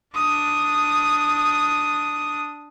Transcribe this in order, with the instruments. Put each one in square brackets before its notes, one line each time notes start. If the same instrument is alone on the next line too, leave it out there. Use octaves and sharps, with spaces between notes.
[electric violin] D4 D#6